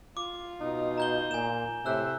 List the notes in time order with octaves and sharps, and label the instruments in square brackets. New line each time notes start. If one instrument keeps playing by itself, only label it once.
[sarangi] F4 [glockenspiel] D6
[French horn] B2 [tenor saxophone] D#4
[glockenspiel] A#5 G6 G7
[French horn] A#2 [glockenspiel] G#5 E7
[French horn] A2 [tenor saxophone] C3 [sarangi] E5 [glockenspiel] E6 F#6